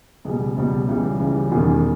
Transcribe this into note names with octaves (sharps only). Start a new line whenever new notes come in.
C#2 B2 G3 G#4
C#2 B2 G3
C#2 C#3 E3 G3
C#2 C#3 E3 G3
E1 E2 D#3 G3 G#4